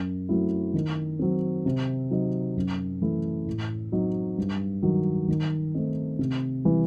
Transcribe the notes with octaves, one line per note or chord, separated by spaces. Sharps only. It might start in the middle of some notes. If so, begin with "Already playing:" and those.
Already playing: F#2
F#3 A3 C4 E4
D#3
F#3 C4
C3
F#3 C4 D#4
F#2
E3 A3 E4
A2
F#3 C4 D#4
G2
D#3 F#3
D#3
A3 C4 D#4
C3
E3 G3